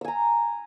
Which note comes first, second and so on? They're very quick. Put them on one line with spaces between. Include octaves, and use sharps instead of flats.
E6 G#5 A#5